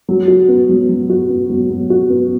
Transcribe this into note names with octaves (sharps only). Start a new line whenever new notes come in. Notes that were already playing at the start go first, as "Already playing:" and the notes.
F#3
F#4
B3
F#3
F#3
F#4
B3
F#3
F#3
F#4
B3